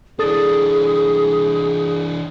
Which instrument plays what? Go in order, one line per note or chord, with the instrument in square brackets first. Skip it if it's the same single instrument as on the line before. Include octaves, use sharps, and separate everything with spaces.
[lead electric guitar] E3 D4 [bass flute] G#4 [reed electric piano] A4 D#6 A6